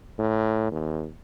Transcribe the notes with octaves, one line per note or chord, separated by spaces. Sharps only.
A2
D#2